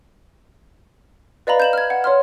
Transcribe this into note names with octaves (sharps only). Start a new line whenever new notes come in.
B4 D5 D#5 F5 A#5 B5
G6 E7 F#7
F6 G#6
F#5
C#5 C6 F6